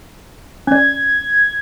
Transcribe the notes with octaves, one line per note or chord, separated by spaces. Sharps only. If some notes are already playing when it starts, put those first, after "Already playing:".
C#4 D5 G#6